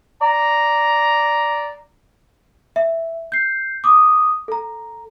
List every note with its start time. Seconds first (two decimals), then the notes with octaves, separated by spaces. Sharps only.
0.22 D5 A#5
2.76 E5
3.32 G6 C7
3.84 D6 D#6
4.48 A4 A#5